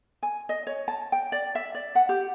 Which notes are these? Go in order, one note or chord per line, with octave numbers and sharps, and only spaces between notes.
G#5
D#5
C#5
A5
G5
D5
E5
D5
F#5
G4